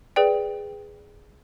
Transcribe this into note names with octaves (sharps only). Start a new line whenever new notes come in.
G#4 B4 D5 G5